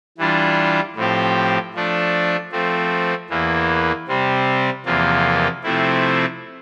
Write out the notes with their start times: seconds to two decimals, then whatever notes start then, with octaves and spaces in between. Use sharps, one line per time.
0.18 E3 G3 D4 F4
0.96 A2 F3 C4 G4
1.74 F3 A3 D4
2.52 F3 A3 C4
3.30 E2 E3 A#3
4.08 C3 G3 C4
4.85 E2 C3 F3 A#3 F4
5.63 C3 F3 A3 C4 E4